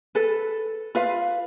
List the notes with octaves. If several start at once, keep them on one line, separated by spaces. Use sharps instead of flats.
A4 B4
F4 B4 F5